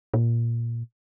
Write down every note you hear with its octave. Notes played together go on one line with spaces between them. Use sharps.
A#2